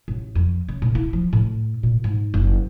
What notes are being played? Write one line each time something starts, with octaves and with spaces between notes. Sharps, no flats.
A1
F2
C#3
A#2
E4
F3
A2
A#2
G#2
F#1